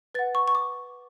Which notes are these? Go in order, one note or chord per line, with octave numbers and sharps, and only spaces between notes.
B4 F#5 A6
C#6
C#6
D6